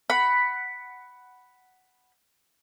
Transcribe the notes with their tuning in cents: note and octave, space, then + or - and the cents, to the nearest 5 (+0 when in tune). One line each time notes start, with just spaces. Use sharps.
F#5 +10 B5 +0